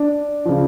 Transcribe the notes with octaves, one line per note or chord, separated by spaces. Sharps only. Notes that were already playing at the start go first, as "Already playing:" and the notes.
Already playing: D4
C#3 F3